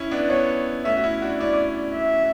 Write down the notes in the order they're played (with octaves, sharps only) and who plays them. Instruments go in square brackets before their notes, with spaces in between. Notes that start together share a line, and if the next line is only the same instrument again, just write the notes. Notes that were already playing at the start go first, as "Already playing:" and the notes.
Already playing: [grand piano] C#4 E4
B3 D4
[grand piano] B3 D4 [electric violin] C#5
[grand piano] A3 C#4 [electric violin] E5
[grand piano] F#4
C#4 E4
D4 F#4
[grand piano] C#4 E4 [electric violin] D5
[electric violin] E5